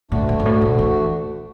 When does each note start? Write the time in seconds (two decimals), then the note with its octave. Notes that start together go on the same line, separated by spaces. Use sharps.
0.11 D2 A2 D3 A3 D4 F#4
0.29 F#2
0.40 F#2
0.46 A2
0.62 B2
0.79 E3